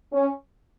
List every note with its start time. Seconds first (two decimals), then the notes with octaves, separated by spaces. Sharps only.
0.12 C#4